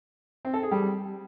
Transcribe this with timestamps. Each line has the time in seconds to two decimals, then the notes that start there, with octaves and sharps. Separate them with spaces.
0.45 C4
0.54 A4
0.62 G#4
0.71 G3